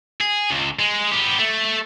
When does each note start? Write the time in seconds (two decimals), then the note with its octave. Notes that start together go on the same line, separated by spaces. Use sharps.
0.21 G#4
0.51 C#2
0.79 G#3
1.11 B3 G4
1.39 A3